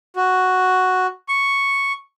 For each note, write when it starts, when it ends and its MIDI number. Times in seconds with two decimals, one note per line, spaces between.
0.16 1.07 66
1.28 1.92 85